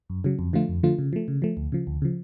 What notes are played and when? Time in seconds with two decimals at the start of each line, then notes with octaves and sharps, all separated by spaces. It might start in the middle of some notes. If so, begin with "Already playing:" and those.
0.10 F#2
0.24 C#3 F#3
0.39 F2
0.53 D3 F3 A3 F4
0.69 F2
0.83 D3 F3 A3 F4
0.98 C#3
1.13 F3 A3
1.28 C#3
1.42 F3 A3
1.57 D2
1.72 C#3 F3
1.87 D2
2.02 C#3 F3